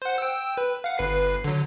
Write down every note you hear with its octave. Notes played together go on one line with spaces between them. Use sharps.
C5 F#5
G5 E6
B4
F5 F#5
G1 B4 C7
D3 F#3